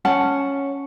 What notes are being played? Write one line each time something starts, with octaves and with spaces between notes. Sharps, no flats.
C#4 F#5 A5